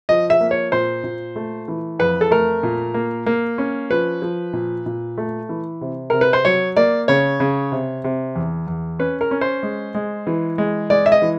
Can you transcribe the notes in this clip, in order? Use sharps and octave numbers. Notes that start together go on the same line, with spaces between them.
F3 D#5
E5
A#3
C#5
A#2 C5
A#2
A3
E3
F2 B4
A4
A3 A#4
A#2
A#3
A#3
C#4
F3 B4
F3
A#2
A#2
A3
E3
C3
C3 A#4
B4
C5
F#3 C#5
A#3 D5
C#3 C#5
C#3
C3
C3
E2
E2
C#4 B4
A#4
C#4
C5
G#3
G#3
E3
G#3
G#3 D5
E5
D#5
E3